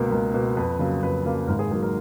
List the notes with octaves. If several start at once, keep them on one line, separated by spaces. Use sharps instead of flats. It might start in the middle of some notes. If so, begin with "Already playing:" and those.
Already playing: C#2 B2 A#3 A#4
C#2 A#4
B2 A#3
F2 B4
C#3 F#3 A#3
F2 B4
C#3 F#3 A#3
G#1 A#4
G#4
G#2 F#3 A#3 G#4
A#4